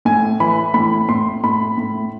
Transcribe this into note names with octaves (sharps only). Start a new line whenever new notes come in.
A2 G#5
E3 B5
A2 B5
A2 C6
A2 B5
A2